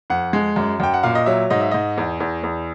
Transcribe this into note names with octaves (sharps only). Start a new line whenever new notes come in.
F2 F#5
G#3
F#2
F#2 G5
F#5
A#2 F5
D#5
F#3 E5
G#2 D#5
E5
G#2 D#5
E2
E2
E2